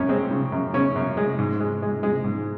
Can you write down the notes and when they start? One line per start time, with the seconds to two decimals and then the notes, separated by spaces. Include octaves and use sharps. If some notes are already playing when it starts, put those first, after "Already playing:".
Already playing: F#2 C#4
0.09 G#3 C4
0.31 C#3
0.52 F#2
0.74 C#3 C#4
0.96 F#2
1.17 G#3
1.39 G#2
1.60 G#3
1.82 G#3
2.03 G#3
2.24 G#2